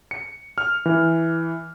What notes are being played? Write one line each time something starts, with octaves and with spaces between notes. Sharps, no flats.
C#7
F6
E3